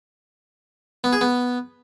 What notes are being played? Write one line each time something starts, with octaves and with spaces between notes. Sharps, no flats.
B3
G#4
B3